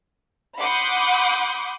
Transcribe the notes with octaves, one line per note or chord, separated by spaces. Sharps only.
F#5 B5 C6 D6 D#6 G6